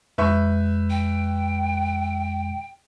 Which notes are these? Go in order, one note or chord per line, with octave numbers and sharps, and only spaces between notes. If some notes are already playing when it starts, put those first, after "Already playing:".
F2 G#3 B4 E5 C#6 G6
G5